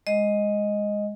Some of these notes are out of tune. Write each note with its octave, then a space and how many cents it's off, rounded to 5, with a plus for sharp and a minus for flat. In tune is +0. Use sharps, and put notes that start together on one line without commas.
G#3 -5 D#5 +0